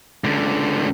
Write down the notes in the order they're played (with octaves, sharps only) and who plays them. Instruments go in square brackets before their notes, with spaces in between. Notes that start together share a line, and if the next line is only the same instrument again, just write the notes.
[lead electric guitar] C#2 D3